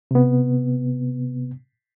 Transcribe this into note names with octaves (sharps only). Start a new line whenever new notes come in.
C3 B3